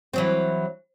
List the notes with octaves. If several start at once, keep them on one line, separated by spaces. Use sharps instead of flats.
E3 F#3 C4